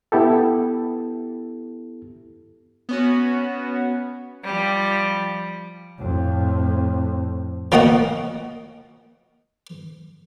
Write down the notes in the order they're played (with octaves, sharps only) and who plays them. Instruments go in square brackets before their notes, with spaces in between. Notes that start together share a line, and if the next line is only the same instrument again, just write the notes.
[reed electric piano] B3 E4 G4 A4
[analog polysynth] B3 C#4 F#4
[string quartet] F3 G3
[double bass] F2 A2
[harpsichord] F3 A#3 F#4 D#5 F#5